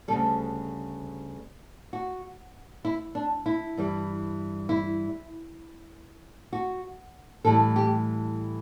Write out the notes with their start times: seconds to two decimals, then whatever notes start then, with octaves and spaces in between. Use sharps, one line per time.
0.08 D2 C#3 G3 A4
1.93 F#4
2.85 E4
3.15 D4
3.46 E4
3.77 G2 E3 G3
4.69 E4
6.53 F#4
7.45 A2 E3 G3 A4
7.76 G4